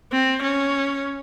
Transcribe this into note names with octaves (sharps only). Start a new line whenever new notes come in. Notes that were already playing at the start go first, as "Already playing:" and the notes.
C4
C#4